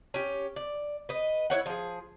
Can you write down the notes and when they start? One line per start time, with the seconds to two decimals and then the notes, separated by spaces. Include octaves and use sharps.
0.14 C#4 G4
0.56 D5
1.09 B4 D#5
1.50 E4 B4 C#5 F#5
1.66 F3 G#4